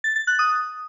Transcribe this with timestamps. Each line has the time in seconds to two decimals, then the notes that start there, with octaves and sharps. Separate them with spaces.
0.04 A6
0.16 A6
0.27 F#6
0.39 D#6